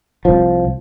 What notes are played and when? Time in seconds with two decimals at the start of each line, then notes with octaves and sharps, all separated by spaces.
0.25 C2 F3